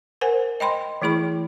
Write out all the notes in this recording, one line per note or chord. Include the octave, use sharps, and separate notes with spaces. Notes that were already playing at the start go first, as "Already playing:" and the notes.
A#4 C5 F#5 G#5
D#5 G5 B5 C6
E3 A3 E4 G#4 B5